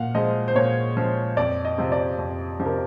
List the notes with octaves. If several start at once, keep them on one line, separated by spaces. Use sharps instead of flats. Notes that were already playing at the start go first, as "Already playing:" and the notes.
Already playing: A#2 F5 F#5
F3 G#3 D#5
C5
A#2 C#5
F3 G#3
F2 D5
D#5
C3 F3
D5
F2
C3 F3
A#4